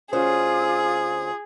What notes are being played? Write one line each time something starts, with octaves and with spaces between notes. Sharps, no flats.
D2 C#4 F4 G#4 C5 D#6